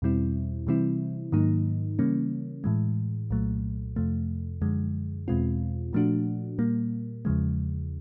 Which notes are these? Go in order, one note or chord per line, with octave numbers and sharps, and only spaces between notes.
E2 B2 G3 C4 E4
C3 E3 G3 C4 E4
G#2 D#3 F#3 A#3 D#4
C#3 E3 G3 A#3 C#4
A2 E3 G#3
C2 A#2 F#3 A3
F2 C3 F3 A3
F#2 D3 F3 G#3
E2 B2 G#3 C4 F4
A#2 F3 A3 D4 F#4
A#2 G3 A#3
E2 C#3 F3 G#3